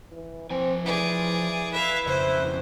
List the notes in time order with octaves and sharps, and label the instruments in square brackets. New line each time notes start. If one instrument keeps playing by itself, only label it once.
[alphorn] E3
[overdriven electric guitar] F3 G#5 [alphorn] C4
[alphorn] E3 [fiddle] G#4 D5
[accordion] E4 B4 [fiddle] E5 F5
[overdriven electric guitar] F2 C#3 [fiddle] C5